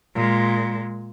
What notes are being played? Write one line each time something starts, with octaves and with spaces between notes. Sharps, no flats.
A#2 G#3